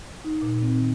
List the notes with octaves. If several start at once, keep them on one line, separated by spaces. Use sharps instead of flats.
D#4
A#2
C4
D#3